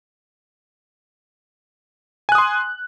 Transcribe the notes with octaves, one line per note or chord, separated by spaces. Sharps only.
G#5 C6 D#6 F#6